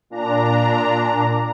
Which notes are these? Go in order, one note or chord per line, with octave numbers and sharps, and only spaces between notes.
A#2 D4 A#5